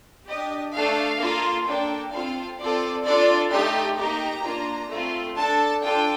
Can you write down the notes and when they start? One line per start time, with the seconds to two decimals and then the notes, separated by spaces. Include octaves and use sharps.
0.28 D4 G4 D#5
0.74 A3 D4 A4 F5
1.19 A#3 F4 A4
1.66 A#3 D4 A4 G5
2.13 C4 F4 A4 F5
2.58 C4 F4 A4 D5
3.04 D4 F4 A4 D5
3.51 A3 D#4 G4 C6
3.97 A#3 D#4 G4 A#5
4.44 A#3 D4 F4
4.90 A3 C4 F4
5.36 D4 A4 A5
5.83 D4 F4 A4 G5